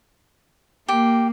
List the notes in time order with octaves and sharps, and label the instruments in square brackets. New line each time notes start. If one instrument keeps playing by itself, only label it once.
[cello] A#3 [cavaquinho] G4